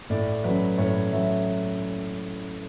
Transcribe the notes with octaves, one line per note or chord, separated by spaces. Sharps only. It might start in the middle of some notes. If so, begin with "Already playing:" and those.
A2 D5
F#3 C#4 B4
A2 C#5
F#3 C#4 E5